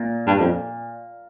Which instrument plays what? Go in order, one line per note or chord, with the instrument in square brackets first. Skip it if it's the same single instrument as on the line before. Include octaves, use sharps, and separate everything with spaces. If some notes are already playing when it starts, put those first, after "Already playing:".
Already playing: [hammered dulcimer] A#2
[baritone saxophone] G2
F2